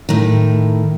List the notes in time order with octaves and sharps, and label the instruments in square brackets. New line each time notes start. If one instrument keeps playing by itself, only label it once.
[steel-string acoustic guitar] A2 D#3